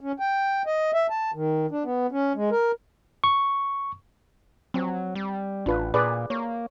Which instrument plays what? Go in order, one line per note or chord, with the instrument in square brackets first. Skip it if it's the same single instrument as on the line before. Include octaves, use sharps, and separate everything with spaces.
[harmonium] C#4
G5
D#5
E5
A5
D#3
D4
B3
C#4
G#3
A#4
[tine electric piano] C#6
[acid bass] F#3 [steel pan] C4
[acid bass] G3
[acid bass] A1 [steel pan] D4 F4 B4
[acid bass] A#2 [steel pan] G#4 B4 D5
[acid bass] A#3 [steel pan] C#5